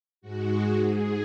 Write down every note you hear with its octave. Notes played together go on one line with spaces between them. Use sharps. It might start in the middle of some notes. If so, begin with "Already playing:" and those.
G#2 G#3 F#4
G#4